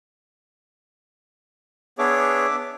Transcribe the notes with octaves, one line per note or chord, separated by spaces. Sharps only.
B3 D4 G#4 C#5 E5 D6